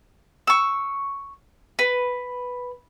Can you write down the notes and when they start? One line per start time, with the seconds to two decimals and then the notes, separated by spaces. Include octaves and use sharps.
0.47 C#6 E6
1.79 B4